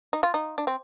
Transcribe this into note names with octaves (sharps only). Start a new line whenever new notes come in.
D#4
F4
D#4
D4
C4